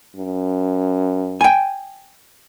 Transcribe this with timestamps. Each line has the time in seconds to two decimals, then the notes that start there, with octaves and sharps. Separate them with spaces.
0.16 F#2
1.41 G5 G#5